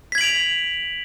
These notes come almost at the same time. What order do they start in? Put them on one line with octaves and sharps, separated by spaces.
B6 G#6 F#7 D7 F7